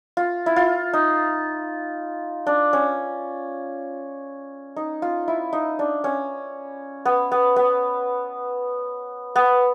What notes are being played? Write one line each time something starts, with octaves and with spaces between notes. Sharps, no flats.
F4
E4
F4
D#4
D4
C#4
D#4
F4
E4
D#4
D4
C#4
B3
B3
B3
B3